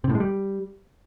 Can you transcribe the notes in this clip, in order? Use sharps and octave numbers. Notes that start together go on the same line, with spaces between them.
C3
A2
G#3
G3